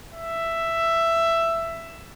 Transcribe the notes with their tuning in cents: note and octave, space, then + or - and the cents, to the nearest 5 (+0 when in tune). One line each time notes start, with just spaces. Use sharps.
E5 +10